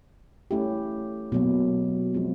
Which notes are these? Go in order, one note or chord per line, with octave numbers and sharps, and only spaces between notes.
A3 C#4 E4 G4
B2 F#3 A#3
F3 G#3 C4 F4